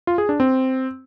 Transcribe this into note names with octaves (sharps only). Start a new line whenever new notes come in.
F4
G#4
D4
C4